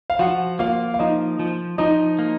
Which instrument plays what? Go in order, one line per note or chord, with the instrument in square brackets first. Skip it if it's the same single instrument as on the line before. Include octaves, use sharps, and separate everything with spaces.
[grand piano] F5
[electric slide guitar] F3 [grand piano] F#4 F#5
[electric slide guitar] A#3 [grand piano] F4 F5
[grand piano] F5
[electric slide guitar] F3 [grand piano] D#4 D#5
[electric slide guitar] F3
[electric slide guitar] F3 [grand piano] D#4 D#5
[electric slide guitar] A#3